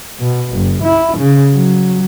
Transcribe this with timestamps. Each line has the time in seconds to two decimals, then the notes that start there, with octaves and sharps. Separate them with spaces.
0.21 B2
0.54 F#1
0.83 E4
1.18 C#3
1.54 F#3